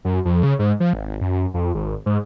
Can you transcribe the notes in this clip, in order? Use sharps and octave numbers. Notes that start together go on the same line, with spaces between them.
F#2
F2
C#3
G#2
F3
G#1
F#2
F2
G#1
G#2